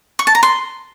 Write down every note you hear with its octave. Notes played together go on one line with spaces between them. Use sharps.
C#6
A5
A#5
C6